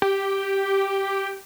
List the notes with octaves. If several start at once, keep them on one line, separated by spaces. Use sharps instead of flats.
G4